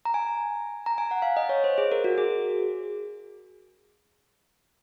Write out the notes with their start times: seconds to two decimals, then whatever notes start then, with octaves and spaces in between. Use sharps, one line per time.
0.05 A#5
0.14 G#5
0.86 A#5
0.98 G#5
1.11 F#5
1.22 F5
1.37 D#5
1.49 C#5
1.64 C5
1.78 G#4
1.92 A#4
2.04 F#4
2.18 G#4